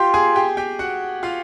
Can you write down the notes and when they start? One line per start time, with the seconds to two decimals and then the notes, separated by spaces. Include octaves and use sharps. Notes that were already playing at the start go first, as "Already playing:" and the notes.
Already playing: F4 G4 G5
0.14 G#4 G#5
0.36 G4 G5
0.57 G4 G5
0.79 F#4 F#5
1.23 F4 F5